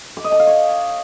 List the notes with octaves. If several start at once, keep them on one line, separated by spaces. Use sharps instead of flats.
D6
D#5
A5
F5
C#5